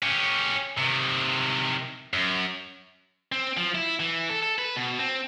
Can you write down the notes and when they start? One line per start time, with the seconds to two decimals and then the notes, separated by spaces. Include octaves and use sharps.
0.02 C#4 G4
0.78 C3 D#3
2.13 F#2
3.32 C4
3.57 F3
3.75 E4
4.00 E3
4.30 A4
4.43 A4
4.59 B4
4.76 B2
4.99 C4